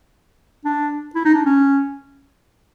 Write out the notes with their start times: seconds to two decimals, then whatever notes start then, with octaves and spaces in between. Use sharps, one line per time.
0.65 D4
1.16 E4
1.25 D#4
1.35 D4
1.45 C#4